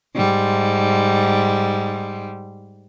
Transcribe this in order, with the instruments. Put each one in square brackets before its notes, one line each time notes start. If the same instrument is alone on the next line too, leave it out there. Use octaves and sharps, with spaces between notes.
[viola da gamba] G#2 G3